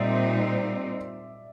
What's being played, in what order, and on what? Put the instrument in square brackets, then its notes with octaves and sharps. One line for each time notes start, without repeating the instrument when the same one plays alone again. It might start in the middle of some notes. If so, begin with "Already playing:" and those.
Already playing: [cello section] A#2 G3 C4 D#4 [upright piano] D5 E5